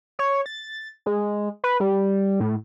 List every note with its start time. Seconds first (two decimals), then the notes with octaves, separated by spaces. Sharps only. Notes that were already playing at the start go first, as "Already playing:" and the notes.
0.19 C#5
0.46 A6
1.06 G#3
1.64 B4
1.80 G3
2.40 A2